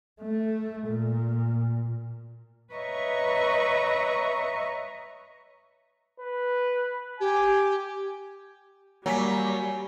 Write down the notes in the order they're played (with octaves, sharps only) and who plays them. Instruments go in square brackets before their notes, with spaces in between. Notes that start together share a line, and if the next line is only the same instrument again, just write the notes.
[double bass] A3
A#2
[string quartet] B4 C#5 D#5 E5 A#5 C#6
[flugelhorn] B4
[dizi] G4 [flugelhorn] G#5
[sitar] F#3 [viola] G3 [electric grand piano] A#3 B6 [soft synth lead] G#5